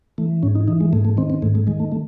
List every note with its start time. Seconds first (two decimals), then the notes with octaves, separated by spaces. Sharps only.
0.18 E3 A3
0.43 G#2 C#4
0.55 D#4
0.68 E3 D#4
0.81 G#3
0.93 G#2 A3
1.05 A3
1.17 D#3 C4
1.30 C4
1.42 G#2 A3
1.55 A3
1.67 D#3 G#3
1.80 A3
1.92 A3